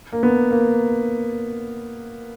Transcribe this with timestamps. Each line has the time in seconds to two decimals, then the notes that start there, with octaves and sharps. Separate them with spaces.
0.12 A#3
0.23 B3
0.51 A#3